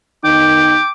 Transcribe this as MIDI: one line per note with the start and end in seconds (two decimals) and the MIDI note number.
0.24 0.79 51
0.24 0.79 59
0.24 0.79 63
0.24 0.87 79
0.24 0.91 86